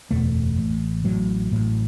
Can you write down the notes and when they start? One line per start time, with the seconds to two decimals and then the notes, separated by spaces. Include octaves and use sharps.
0.11 F#1 E2 B2 A3
0.58 A1 A2
1.04 A1 A2 F#3
1.51 A1 A2